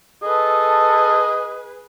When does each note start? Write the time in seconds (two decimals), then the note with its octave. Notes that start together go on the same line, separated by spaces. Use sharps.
0.23 G#4 A4 B4 D#5